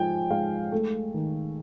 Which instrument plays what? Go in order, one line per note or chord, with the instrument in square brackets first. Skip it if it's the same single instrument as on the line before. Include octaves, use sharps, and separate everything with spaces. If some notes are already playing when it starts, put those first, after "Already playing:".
Already playing: [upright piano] F3 G#3 G5 G#5
G#3 F5
A3
D#3